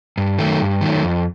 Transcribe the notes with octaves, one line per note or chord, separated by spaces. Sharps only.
G2
D#3 F#3 A3
G2
D#3 F#3 A3
F2